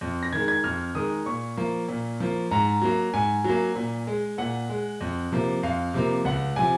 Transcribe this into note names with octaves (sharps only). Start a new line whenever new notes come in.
F2
A#6
D#3 G#3 G#6
G#6
F2 F6
D#3 G#3 D#6
A#2 C#6
F3 A#3
A#2
F3 A#3
G#2 A#5
F#3 A#3
G#2 G#5
F#3 A#3
A#2
G#3
A#2 F#5
G#3
F2
C3 F3 A#3
F2 F5
C3 F3 A#3
C#2 F#5
C3 F3 G#5